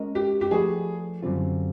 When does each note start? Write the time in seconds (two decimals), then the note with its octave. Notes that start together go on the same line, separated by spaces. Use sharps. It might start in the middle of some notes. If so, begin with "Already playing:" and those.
Already playing: G#3 C#4 F#4 A#4 D#5
0.15 G4
0.41 G4
0.51 F3 A3 D4 F#4 G#4 B4
1.22 F#2 D3 G3 C4 F4